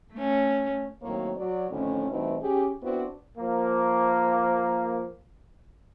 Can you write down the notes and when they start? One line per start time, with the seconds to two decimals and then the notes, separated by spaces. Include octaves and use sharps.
0.14 A3 C#4
1.02 A2 D#3 F#3 A#3 C4 C#5
1.37 F#3 D5
1.69 F2 A2 D3 D#3 A3 C#4
2.09 G2 B2 E3 A3 C4 D#4
2.42 C#4 G4 G#4
2.82 B3 C4 D4 E4 F#4 C5
3.38 F3 A#3